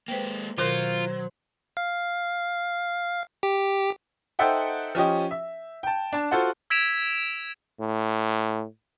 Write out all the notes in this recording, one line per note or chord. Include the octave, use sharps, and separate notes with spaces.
G#3 A#3 B4 C5 G5
B2 D#3 F#3 F4 A#4 C5
F5
G4
D#4 A4 C5 E5 F#5 G5
F3 C#4 G4 D#5
E5
G5 A5
D4 A5
F4 F#4 A4 C5 F#5
E6 G#6 B6 D7 E7 F7
A2